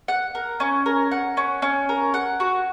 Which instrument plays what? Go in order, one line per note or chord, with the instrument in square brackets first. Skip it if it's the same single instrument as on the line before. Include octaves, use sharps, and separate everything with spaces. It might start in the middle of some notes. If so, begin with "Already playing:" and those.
[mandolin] F#5
A#4
C#4
A#4
F#5
C#4
C#4
A#4
F#5
F#4